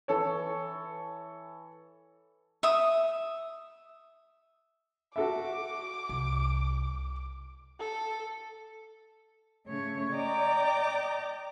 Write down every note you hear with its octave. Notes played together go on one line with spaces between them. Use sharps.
E3 A4 C#5
E5 D#6
F#4 A4 E5 D6
C2
A4
C#3 A3 C#5
D5 D#5 G5 A#5 D6